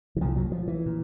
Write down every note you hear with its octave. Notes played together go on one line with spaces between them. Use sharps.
E3
C2 A#2 F3
F#3
F3
E3
A#2